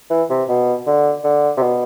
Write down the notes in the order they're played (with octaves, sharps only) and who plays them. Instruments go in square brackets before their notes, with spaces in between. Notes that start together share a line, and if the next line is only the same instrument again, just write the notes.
[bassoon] E3
C3
B2
D3
D3
C3
B2